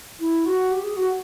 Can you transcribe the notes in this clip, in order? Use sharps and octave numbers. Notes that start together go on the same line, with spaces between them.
E4
F#4
G4
G#4
F#4